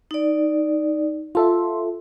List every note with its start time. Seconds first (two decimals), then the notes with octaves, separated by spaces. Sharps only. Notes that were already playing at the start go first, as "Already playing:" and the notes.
0.11 D#4 D5
1.35 F4 A4 E5 C6